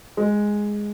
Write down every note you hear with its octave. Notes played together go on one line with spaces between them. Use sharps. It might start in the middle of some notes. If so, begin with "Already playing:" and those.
G#3